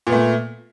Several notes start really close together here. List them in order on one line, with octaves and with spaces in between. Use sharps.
A#2 B3 A3